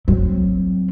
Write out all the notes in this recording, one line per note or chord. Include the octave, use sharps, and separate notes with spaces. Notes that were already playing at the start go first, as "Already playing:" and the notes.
F#3 C4